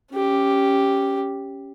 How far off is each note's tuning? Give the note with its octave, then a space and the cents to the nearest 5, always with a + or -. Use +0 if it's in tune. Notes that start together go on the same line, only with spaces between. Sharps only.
C#4 +0 G4 +0